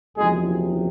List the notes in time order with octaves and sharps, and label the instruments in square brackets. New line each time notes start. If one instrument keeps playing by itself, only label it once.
[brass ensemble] F#1 E2 C3 F3 G#3 G#4